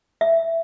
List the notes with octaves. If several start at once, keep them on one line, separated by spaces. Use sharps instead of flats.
E5